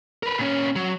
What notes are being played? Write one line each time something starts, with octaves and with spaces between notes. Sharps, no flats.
A#4 B4
A#2 C#4
F#3